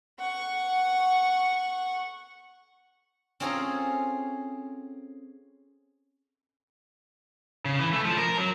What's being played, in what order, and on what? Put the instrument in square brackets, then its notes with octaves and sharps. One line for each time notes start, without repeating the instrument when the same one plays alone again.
[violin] F#5 C#6
[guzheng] C4 C#4 F4 G#4 A4 A#5
[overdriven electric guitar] C#3
E3
A3
F3
A#4
F#3